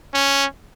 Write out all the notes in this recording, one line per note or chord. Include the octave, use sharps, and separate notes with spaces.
C#4